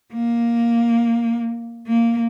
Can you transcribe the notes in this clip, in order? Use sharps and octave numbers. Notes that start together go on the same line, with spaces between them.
A#3
A#3